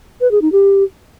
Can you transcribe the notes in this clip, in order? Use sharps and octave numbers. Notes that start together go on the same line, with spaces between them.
B4
G#4
D#4
G4